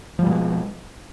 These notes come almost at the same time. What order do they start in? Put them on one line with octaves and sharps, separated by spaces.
F3 G3 B2 G#3